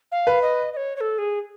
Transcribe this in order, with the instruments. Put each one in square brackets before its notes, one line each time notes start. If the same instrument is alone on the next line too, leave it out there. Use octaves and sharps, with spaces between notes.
[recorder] F5
[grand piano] B4
[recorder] D#5
D#5
C#5
C#5
A4
G#4